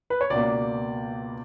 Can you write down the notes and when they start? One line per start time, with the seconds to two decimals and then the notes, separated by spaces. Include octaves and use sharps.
0.10 B4
0.21 C#5
0.30 C#2 B2 A#3 D5